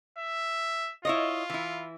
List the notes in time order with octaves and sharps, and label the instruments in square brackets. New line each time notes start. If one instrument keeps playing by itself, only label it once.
[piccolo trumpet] E5
[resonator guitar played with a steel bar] E4 C#5 D#5 [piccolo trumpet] F4
[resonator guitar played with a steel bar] E3 E4